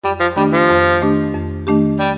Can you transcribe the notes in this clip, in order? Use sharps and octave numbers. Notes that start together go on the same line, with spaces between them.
F2 G3
F3
D#3 G3 A3 D4 G4
F3
F2
D#3 A3 D4 G4
F2
D#3 A3 D4 G4
G3